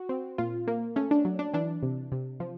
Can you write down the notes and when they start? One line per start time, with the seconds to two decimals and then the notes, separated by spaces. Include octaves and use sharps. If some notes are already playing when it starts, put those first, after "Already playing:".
Already playing: F#4
0.09 C4
0.38 A#2 F4
0.67 A#3
0.96 A3 C#4
1.11 D4
1.25 F#3
1.39 D4
1.53 E3 D4
1.83 C3
2.12 C3
2.40 F3